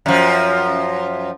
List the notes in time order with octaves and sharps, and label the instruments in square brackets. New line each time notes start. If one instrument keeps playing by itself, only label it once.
[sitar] F#2 F3